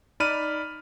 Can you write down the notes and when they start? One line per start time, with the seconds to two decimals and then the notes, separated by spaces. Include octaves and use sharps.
0.20 D#4 D5 B5 F6 D#7